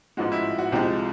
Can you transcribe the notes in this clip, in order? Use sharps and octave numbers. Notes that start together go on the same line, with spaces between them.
A1 G#2 F3 G#3 F#4
E4
F#4
C2 C3 F3 G#3 G4